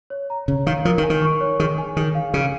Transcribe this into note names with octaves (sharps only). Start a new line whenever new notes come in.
C#5
A#5
C#3 C#5
D#3 F5
F3 A#4
D#3
G#5
D#3
C#6
C#5
D#3 G#4
G#5
D#3 G#4
F5
C#3 G#4